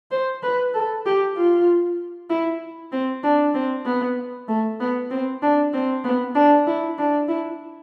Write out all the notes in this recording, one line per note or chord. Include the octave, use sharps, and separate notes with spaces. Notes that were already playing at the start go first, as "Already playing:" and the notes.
C5
B4
A4
G4
F4
E4
C4
D4
C4
B3
A3
B3
C4
D4
C4
B3
D4
E4
D4
E4